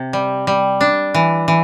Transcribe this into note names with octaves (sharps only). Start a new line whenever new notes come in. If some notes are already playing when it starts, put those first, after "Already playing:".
Already playing: C3
G3
G3
D4
E3
E3